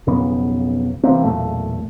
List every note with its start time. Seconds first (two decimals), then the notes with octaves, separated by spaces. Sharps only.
0.07 B1 F2 C#3 B3
1.03 C3 E3 A#3 C4
1.24 B1 E2 A#2 A3